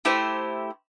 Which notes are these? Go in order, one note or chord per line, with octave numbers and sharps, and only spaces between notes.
A3 E4 G4 C5